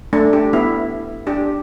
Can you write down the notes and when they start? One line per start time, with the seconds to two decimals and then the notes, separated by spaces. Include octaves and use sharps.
0.13 A3 D4
0.33 D4 G4
0.53 B3 E4
1.27 D4 G4